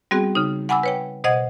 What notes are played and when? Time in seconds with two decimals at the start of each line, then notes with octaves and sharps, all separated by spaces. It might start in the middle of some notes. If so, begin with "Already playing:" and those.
0.11 G3 B3 C4 F#4 G#4
0.35 C#3 D#4
0.69 F#5 G#5 B5 D6 E6
0.83 B4 C#5 G5
1.24 B2 C5 D#5 F#5 G#6